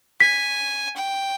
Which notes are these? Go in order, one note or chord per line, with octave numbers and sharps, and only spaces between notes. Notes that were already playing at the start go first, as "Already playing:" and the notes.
G#5 B6
G5